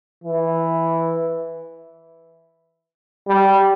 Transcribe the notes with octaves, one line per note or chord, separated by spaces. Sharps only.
E3
G3